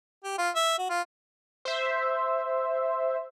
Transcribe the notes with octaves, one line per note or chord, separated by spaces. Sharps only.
G4
F4
E5
F#4
F4
C5 E5